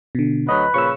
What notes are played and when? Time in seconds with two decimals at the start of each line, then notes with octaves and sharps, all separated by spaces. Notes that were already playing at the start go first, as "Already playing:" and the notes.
0.15 B2 D3
0.49 D2 F#3 B4 D#5
0.74 A#2 C#3 F3 C#6 E6